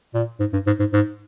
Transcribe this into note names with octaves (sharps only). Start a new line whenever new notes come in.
A#2
G#2
G2
G#2
G#2
G#2